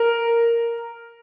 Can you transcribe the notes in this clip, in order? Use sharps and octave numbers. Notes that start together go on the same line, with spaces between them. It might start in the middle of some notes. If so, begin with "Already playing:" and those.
Already playing: A#4